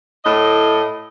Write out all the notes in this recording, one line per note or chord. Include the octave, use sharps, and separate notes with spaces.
A2 D#5